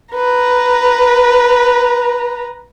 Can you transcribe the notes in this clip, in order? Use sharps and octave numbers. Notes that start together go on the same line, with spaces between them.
B4 A#5